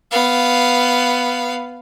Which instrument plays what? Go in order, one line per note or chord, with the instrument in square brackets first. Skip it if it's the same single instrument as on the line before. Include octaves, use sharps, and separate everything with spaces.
[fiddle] B3 F5